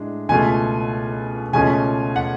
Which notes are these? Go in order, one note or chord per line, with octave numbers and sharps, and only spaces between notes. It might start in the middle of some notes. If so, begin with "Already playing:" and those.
Already playing: A2 G#3 D4
C#2 B2 A3 F4 G#5
C#2 B2 A3 C#4 F4 G#5
F#5